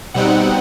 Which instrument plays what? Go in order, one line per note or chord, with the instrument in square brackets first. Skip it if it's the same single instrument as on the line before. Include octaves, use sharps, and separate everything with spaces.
[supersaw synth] B2 G3 C4 D#4 F#5